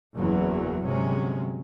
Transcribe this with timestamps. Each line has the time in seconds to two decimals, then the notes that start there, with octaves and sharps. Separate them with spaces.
0.16 F#1 E2 E3 F#3
0.83 G1 C3 F#3 G#3 C#4